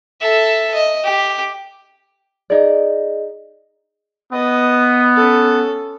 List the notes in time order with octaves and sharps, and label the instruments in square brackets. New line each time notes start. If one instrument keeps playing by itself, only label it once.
[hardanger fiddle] A4 E5
D#5
G4
[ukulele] D#4 D5 [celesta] G#4 D#5
[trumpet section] B3 [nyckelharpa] B4 D#5
[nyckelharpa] C#4 A4